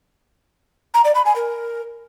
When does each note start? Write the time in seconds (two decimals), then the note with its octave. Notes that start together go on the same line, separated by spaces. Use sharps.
0.94 A#5
1.05 D5
1.15 B5
1.25 G#5
1.36 A#4